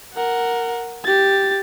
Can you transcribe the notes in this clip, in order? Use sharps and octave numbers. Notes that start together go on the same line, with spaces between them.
A#4 F#5
G4 A6